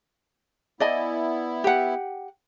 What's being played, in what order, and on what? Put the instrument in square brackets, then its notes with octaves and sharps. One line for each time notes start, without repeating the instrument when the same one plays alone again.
[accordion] B3 E4 [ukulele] D5 D#5 G#5
[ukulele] G4 F#5